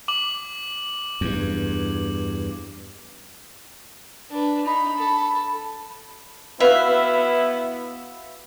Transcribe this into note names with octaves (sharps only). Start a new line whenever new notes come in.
D6 F#7
E2 G2
D4 B4
D#4 B5
A4
B3 E4 F#4 B4 E5 F5